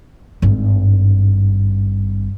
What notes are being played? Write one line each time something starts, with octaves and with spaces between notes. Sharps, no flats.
G#1 G2